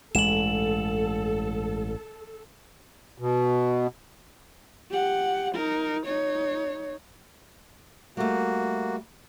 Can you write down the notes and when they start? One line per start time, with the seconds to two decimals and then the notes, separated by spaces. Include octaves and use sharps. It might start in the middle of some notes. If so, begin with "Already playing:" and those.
0.15 A1 G2 G#3 A4 E7 F#7
3.18 B2
4.91 G4 F#5
5.55 D#4 A#4
6.06 D#4 C#5
8.17 G3 A3 A#3 F#4